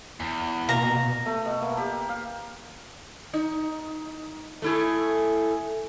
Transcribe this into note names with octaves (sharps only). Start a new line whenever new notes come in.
E2
B2 A#3 A#5
A3
B2
A#3
G4
F5
D#4
A3 E4 G#4